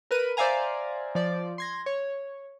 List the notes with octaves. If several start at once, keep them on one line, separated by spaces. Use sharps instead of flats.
A#4 B4 D#7
C5 D5 E5 F5 G#5 A#5
F3 D5
C6 G#6 A#6
C#5